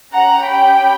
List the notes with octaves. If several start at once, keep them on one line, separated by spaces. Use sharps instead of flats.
C#4 G4 F#5 A#5
G5 B5